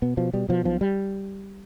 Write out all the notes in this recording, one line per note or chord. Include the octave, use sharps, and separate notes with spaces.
B2 B3
B2 F3
B2 G3
B2 F3
B1 F3
G3